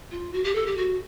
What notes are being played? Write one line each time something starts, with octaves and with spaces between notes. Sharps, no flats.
F4
F#4
G4
A4
G4
F#4